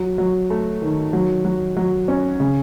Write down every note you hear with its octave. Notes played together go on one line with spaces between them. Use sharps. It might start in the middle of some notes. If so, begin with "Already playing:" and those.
Already playing: F#3
F#3
A3
D#3
F#3
F#3
F#3
C#4
C#3